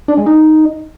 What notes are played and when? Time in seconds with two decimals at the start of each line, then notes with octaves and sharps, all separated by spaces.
0.08 D4
0.17 G#3
0.26 D#4